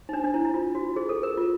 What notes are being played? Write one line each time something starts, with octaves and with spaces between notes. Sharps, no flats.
D#4
D4
D4
E4
E4
F4
F#4
G#4
A4
A#4
F4